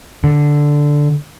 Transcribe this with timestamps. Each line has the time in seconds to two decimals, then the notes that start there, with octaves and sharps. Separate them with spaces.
0.24 D3